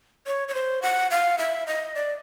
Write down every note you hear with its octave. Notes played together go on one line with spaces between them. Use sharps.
C#5
C#5
C5
F#5
F5
E5
D#5
D5